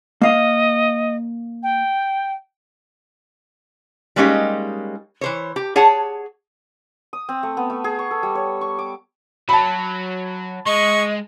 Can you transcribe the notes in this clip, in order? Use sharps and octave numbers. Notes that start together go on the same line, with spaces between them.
A#3 D#5 F5
G5
G3 G#3 A#3 C#4 D#4 G4
E3 C5 C#5
G4
G#4 C#5 F#5 A5
D#6
C4
A3
B3
A3
G#4
C#6
A4
G3
C#5
C#6
D6
F#3 A5 B5
G#3 D#5 C#6